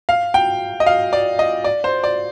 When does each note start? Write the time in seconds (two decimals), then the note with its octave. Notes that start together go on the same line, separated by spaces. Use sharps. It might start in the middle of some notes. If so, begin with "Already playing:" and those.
0.09 F5
0.34 G5
0.80 D#5
0.86 F5
1.13 D5
1.39 D#5
1.64 D5
1.84 C5
2.04 D5